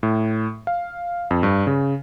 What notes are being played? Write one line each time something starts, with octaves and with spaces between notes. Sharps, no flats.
A2
F5
F2
G2
C#3